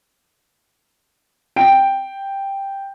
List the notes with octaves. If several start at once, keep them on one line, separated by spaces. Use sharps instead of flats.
G5 D7